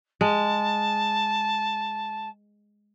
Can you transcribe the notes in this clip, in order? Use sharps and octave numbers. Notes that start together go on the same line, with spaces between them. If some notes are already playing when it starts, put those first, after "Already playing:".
G#3 A5